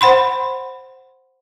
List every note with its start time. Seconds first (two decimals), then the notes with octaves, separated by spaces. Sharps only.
0.01 C5 F#5 B5 C6